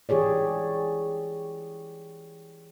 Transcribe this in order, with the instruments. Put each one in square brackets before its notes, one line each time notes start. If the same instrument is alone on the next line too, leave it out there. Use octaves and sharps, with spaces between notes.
[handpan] E3 G4 G#4 C#5 D5